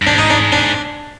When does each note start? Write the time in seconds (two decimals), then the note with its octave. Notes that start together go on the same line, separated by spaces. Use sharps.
0.02 G2
0.07 G#2 D4
0.18 D#4
0.30 D4
0.52 D4